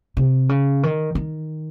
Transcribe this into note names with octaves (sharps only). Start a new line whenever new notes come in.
C3
C#3
D#3
D#3